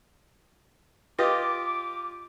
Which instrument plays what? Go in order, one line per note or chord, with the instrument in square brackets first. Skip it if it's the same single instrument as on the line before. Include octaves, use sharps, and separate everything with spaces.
[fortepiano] F4 G4 D#5 [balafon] B4 [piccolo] D6